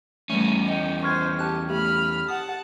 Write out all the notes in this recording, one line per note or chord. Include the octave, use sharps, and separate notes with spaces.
E2 E3 G3 A3 C#4
D#5 G5
C5 C#6 F6 G#6
G4 A5 F#6
A3 G4 B5 F6
F#5 A5 D#6